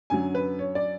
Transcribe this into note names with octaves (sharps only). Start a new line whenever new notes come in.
F#2 D3 F#3 G#5
B4
C#5
D5